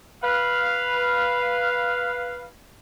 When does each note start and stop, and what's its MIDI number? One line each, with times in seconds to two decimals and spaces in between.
0.23 2.45 71
0.23 2.45 77